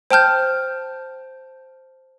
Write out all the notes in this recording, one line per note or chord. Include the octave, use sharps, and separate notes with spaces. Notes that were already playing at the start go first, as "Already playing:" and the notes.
C5 G5 A5 F6 G6